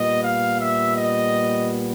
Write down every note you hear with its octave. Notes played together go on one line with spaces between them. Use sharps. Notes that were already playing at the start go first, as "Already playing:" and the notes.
Already playing: A#2 G3 B3 D#5
F5
E5
D#5